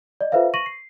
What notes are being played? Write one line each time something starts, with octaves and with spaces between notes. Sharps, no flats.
D5 D#5
F4 A4 B4 C5 E5 F5
C#6 A#6 D#7 F#7
C7